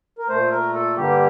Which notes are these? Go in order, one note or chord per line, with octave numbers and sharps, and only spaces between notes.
A#4
A#2 A3 C5
A#4
A4
G2 D3 G3 A#3 G4